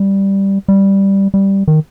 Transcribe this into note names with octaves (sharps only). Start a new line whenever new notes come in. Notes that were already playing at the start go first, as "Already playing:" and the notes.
Already playing: G3
G3
G3
D#3